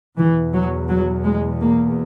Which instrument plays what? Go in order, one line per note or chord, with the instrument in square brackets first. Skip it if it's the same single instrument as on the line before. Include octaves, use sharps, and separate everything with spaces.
[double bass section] E2 B2 E3
F#3
F#3
G#3
A#3